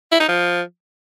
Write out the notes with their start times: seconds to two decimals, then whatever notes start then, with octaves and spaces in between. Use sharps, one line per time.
0.12 E4
0.20 D#4
0.28 F3